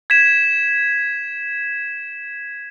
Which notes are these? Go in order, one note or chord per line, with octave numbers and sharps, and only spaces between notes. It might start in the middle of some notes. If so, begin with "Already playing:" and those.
G#6 B6 E7